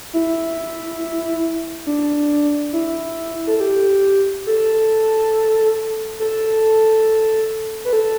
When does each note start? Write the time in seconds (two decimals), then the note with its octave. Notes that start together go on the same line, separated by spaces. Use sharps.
0.14 E4
1.86 D4
2.73 E4
3.47 A4
3.60 G4
4.47 A4
6.20 A4
7.85 B4
7.93 A4